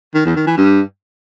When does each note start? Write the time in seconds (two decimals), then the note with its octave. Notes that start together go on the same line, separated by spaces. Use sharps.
0.15 D#3
0.25 E2
0.36 D#3
0.47 E3
0.58 G2